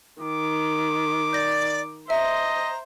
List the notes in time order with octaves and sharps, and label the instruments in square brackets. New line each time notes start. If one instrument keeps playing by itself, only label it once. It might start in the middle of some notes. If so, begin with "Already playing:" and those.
[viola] D#3 [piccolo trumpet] D6
[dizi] D5 [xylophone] G6 A#6
[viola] C5 [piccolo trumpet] D#5 [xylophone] E5 [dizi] A#5